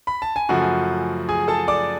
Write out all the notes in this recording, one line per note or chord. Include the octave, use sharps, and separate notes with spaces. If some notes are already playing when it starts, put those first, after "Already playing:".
B5
A5
G#5
F#2 C#3 F3 A3 F#4 F#5
G#4 G#5
A4 A5
D5 D6